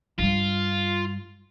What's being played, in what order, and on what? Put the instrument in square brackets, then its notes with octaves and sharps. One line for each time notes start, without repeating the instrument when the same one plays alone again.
[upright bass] G2 G3 [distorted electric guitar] F4